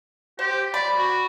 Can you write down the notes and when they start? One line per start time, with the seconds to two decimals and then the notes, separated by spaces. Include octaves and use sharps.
0.39 G4 C5
0.74 D5 B5
0.97 F#4